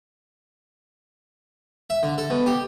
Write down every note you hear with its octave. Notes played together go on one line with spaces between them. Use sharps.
E5
D3
A4
B2
G4